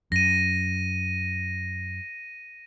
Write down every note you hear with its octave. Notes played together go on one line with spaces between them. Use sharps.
F#2 A#6 D#7